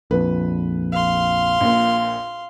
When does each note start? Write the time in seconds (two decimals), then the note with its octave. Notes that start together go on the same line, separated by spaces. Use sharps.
0.11 A#1 F2 B4
0.92 F5 C6
1.60 A#1 A#2